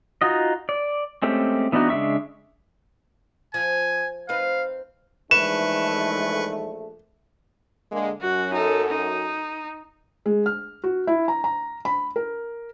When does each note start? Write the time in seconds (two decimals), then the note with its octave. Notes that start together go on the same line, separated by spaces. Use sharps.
0.21 D#4 F4 F#4 D#5
0.69 D5
1.22 G#3 A3 C4 C#4 G4
1.72 E3 B3 D4 D#4 F#4
1.89 C#3 G#3 D4 E5 C#6
3.54 F3 G#5
4.29 C4 D#4 B4 F5
5.31 A#1 E3 G#3 A3 D#4 B4 C#6 E7
7.92 D3 G#3 A#3
8.22 F#2 F#4
8.53 D#4 A4
8.89 D#4
10.26 G#3
10.46 F6
10.84 F#4
11.07 E4
11.28 A#5
11.44 A#5
11.85 B5
12.16 A#4